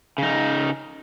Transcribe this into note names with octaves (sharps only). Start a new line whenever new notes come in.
C#3 D#4